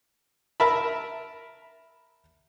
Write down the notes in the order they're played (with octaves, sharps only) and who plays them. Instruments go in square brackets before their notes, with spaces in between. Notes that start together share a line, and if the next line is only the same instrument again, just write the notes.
[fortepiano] A#4 E5 A5 B5